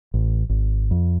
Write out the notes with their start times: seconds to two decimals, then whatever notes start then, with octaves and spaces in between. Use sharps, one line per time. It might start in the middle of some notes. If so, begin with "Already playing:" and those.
0.14 A1
0.49 G#1
0.91 F2